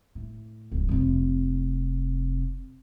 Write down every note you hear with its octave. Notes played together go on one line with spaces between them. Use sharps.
A2
D1
F1 C3